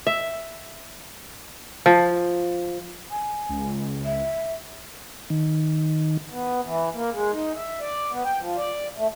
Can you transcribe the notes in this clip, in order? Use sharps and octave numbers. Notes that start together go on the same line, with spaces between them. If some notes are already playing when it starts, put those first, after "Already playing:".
E5
F3
G#5
C#2
E5
D#3
B3
E3
A#3
G#3
D#4
E5
D5
B3
G5
F3
D5
A3